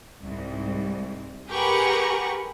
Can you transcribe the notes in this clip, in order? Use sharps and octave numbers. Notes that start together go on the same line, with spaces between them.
C2 G#2
G4 G#4 A#4 B4 F#5 C#6